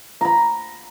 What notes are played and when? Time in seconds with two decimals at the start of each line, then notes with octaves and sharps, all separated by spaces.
0.21 A#5 B5